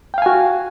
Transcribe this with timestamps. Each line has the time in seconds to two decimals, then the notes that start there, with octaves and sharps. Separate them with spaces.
0.14 G5
0.18 F5
0.22 G#5
0.26 F#4